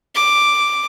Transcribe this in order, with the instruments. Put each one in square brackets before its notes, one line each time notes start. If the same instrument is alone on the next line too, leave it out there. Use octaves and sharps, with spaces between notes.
[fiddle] D6